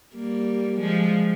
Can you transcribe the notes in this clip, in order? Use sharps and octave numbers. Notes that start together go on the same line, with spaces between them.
G3 A#3
F3 G#3